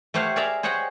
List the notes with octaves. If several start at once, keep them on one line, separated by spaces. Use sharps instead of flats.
A3 G4 C5 C#5 F5 F#5
G#4 A#4 D5 E5 F5 A#5
G#4 C5 C#5 D#5 F#5 G5